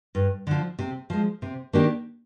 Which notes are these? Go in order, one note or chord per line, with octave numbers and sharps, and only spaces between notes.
G2
D3 F3
C3
F3 G#3
C3
D#3 A#3 D4 G4